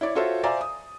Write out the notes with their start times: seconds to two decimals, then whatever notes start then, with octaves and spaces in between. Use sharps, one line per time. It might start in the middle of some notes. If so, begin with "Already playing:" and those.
0.01 E4 C#5 D5
0.15 F4 F#4 A4 C5 C#5 E5
0.43 C5 D5 E5 F5 G#5 A#5
0.61 D#6